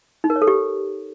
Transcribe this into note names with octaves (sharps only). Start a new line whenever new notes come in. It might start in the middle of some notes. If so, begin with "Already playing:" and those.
D#4
A#4
C#5
A4
G4